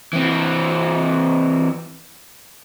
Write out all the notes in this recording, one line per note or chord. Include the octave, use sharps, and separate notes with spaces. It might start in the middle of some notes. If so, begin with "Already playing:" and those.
E3 C4